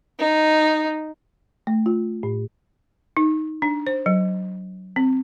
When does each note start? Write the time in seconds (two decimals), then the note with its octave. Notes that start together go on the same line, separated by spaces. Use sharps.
0.19 D#4
1.67 A3
1.86 F4
2.23 A2
3.17 D#4
3.62 D4
3.87 C5
4.06 F#3
4.96 C4